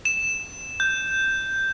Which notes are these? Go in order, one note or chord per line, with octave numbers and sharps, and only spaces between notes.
E7
G6